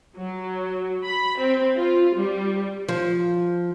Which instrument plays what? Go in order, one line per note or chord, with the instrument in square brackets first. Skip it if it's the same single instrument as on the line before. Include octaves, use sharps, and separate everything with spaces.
[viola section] F#3
B5
C4
F4
G3
[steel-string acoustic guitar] F3